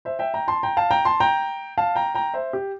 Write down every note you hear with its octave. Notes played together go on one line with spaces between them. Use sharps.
C5 E5
E5 G5
G5 A#5
A5 C6
G5 A#5
F5 A5
G5 A#5
A5 C6
G5 A#5
F5 A5
G5 A#5
G5 A#5
C5 E5
G4